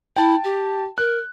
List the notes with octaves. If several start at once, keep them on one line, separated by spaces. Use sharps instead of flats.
E4 G5 A5
G4
A#4 F#6